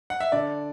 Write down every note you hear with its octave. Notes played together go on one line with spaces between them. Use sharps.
F#5
E5
D3 D5